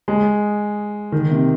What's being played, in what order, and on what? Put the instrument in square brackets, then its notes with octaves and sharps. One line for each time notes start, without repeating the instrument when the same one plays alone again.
[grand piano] G#3
D#3
C3